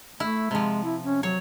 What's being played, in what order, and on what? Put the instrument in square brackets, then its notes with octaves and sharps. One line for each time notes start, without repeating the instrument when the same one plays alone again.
[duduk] A3 [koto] E4
[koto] C3 F3 [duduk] G#3
[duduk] E4
C#4
[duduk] F#3 [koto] C#5